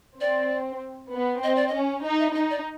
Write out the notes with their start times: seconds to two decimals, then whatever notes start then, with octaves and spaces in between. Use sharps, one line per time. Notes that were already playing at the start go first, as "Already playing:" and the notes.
0.20 C4 D5
1.12 B3
1.43 C4 D#5
1.55 D5
1.67 D#5
1.73 C#4
2.03 D#4 D#5
2.19 E5
2.34 D#4 D#5
2.50 D5